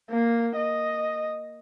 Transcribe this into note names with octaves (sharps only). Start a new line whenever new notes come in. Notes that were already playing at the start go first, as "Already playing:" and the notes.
A#3
D#5